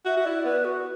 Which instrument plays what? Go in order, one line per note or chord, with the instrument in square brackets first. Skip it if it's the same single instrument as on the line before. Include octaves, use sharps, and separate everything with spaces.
[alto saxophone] F#4 [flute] E5
[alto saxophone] F#4
[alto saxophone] E4 [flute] D5
[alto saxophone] B3 [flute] B4
[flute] F#4